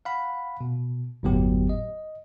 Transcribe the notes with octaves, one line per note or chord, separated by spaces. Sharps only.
F5 F#5 B5
B2
G1 E2 A2 F#3 B3 G4
D#5